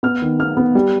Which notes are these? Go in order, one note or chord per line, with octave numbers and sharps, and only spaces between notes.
B3 F6
D#3
B3 F6
B3
G3